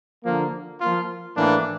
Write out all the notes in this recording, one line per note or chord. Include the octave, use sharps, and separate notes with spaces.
D3 F3 A#3
F3 A#3 F4
A2 E3 A#3 D4